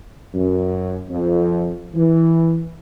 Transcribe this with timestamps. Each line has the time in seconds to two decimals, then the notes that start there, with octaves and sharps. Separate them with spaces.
0.34 F#2
1.09 F2
1.94 E3